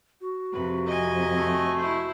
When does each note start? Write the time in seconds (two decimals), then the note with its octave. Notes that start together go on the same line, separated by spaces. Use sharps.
0.21 F#4
0.53 F2 C3 B4
0.86 D#5 G#5
1.35 A3
1.77 E4 C5